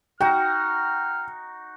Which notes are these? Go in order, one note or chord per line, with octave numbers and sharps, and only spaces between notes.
D#4 F#4 G5 F6